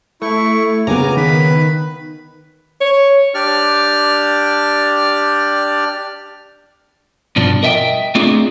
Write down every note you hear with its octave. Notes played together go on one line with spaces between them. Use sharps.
A3 E4 C#6
C#3 B3 G#5 A#5 D6
D#3 B4 B5
C#5
D4 G4 D5 F6
G2 B2 F3 D4
A#4 D#5 E5 F#5 G5
A3 C4 D4 D#4 F4 G#4